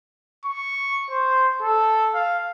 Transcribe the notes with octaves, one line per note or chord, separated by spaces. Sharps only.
C#6
C5
A4
F5